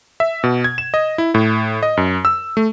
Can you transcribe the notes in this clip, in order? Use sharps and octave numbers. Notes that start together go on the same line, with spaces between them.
E5
B2
G#6
E7
D#5
E4
A2
D#5
F#2
E6
A3